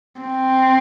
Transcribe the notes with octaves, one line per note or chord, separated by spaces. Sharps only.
C4